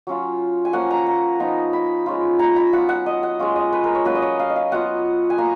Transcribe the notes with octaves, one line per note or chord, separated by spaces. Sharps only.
F#3 C#4 F4
G#5
F3 A#3 C#4 F#5
A#5
A#5
F3 B3 D#4
B5
G#3 C#4 F4
A#5
B5
F#3 B3 F4 F#5
F#5
D#5
F#5
G#3 C#4 F4
D#5
B4
A#4
C#5
F#3 A#3 C#4 B4
D#5
C#5
F5
D#5
F5
F#3 B3 F4 F#5
G#5
A#3 A#5